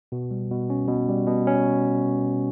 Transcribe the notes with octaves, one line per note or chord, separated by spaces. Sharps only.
B2
G3
B2
C#4
B2
G3
B2
C#4